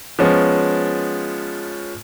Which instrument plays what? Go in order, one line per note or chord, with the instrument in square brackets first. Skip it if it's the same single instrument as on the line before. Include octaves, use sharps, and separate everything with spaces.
[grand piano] F3 G#3 B3 C#4